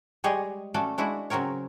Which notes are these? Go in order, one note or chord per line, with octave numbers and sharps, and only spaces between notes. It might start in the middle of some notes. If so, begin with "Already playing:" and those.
G3 G#3 G4 G#4 C#5 D#5
A3 C#4 F#4 A4 D5
G#3 D4 E4 F#4 F#5
C#3 F#3 C4 A#4 C#5